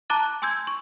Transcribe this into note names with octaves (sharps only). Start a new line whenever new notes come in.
A5 A#5 D6 F#6 A6
G#5 C6 E6 G6 G#6
C#6